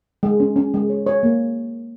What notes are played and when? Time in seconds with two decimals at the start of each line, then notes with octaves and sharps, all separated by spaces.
0.23 G#3
0.40 C#4
0.56 C#4
0.74 G#3
0.90 C#5
1.07 C#5
1.23 A#3